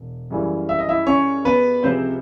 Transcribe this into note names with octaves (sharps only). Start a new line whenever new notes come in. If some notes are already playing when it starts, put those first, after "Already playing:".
Already playing: E1
F#2 C#3 E3 G3
E5
D#5
E4 E5
C#4 C#5
B3 B4
C#2 C3 F3 G#3 C4 C5